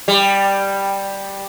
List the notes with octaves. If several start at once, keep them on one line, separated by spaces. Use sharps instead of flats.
G3